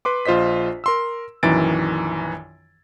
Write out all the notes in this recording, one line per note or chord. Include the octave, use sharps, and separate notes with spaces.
B4 C6 D6
A#1 F4 C5 D#5 B6
A#4 C6 E6
A#1 F#2 D#3 E3 A6 D7